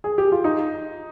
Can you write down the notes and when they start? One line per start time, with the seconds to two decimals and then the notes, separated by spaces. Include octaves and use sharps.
0.04 G#4
0.18 G4
0.32 F4
0.44 D#4